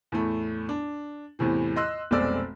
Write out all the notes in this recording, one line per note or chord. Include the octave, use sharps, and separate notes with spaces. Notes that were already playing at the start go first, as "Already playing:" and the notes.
E2 A2 A3
D4
E2 A2 C3 E3
D#5 C6 E6 F#6
F1 B1 G#3 C4 D5 E6